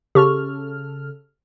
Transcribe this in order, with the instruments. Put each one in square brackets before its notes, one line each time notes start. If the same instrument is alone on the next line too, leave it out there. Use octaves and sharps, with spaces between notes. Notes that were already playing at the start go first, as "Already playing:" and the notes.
[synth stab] C#3 A4 F6 [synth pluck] G4 C#6